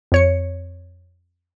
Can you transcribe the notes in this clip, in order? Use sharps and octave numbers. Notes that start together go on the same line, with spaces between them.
F2 C#5 C#7